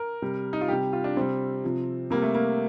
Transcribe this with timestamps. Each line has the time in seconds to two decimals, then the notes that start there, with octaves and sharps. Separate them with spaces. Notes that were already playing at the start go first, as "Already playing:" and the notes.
Already playing: A#4
0.22 C3 G3
0.53 D#4
0.61 F4
0.68 C3 G3 G4
0.93 F4
1.04 D4
1.17 C3 G3 C4
1.64 C3 F3
2.10 C3 G3 A#3
2.22 A3
2.35 A#3